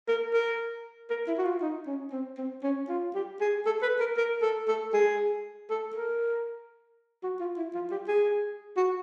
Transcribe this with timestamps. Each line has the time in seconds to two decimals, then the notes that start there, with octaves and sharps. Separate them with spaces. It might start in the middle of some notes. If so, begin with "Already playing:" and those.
0.08 A#4
0.33 A#4
1.10 A#4
1.27 E4
1.38 F#4
1.45 F4
1.62 D#4
1.87 C#4
2.12 C4
2.38 C4
2.63 C#4
2.89 F4
3.15 G4
3.41 G#4
3.66 A4
3.82 B4
4.00 A#4
4.17 A#4
4.42 A4
4.68 A4
4.94 G#4
5.70 A4
5.96 A#4
7.23 F#4
7.40 F4
7.57 E4
7.75 F4
7.91 G4
8.08 G#4
8.77 F#4